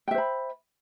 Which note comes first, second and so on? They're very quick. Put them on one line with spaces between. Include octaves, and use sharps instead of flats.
G5 E5 C5 B5